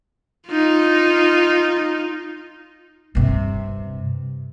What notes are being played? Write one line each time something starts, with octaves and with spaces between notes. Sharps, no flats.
D#4 F4
G2 C3